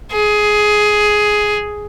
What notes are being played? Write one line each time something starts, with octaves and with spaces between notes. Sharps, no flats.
G#4